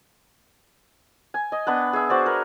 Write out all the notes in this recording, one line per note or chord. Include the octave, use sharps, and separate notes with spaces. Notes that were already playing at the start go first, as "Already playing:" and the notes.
G#5
D#5
B3 D4 B4
G#4 E5
F#4 C5 D5
A#4 B4